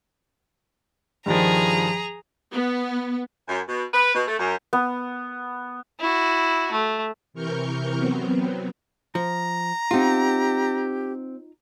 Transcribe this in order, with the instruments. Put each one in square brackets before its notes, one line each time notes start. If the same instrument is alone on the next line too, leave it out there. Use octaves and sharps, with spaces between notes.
[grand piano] G2 D#3 F3 [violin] G#4 A#5
[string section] B3
[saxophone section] F#2
B2
B4
B2
A3
F#2
[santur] B3
[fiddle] E4 F#4
A3
[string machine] C3 E3 A#4 C#6 F6 G6
F#3 B3 C4
[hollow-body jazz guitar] F3 [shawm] A#5
[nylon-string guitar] C4 F#5 [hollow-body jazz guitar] D#4 F4 [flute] G4